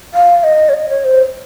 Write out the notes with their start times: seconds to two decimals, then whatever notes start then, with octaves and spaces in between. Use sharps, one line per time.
0.14 F5
0.44 D#5
0.69 C#5
0.74 D#5
0.89 C#5
1.05 C5